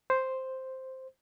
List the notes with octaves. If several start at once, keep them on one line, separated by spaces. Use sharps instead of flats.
C5